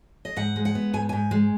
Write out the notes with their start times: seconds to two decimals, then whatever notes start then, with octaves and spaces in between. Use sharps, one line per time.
0.25 D#5
0.36 G#2 F#5
0.56 G#3
0.65 F#5
0.75 B3
0.94 G#2 G#5
1.09 G#2 G#5
1.31 G#3